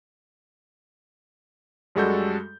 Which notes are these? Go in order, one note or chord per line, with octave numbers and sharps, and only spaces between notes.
F#2 G3 G#3 F#4 A4 G6